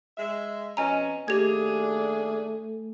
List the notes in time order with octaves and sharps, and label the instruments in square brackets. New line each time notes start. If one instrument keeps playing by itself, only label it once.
[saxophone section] G#3 E5
[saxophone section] F2 B2 C#4 [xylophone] D#5 G#5 A#5
[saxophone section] D#2 D4 G#4 [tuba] A3 [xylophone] G4 G#6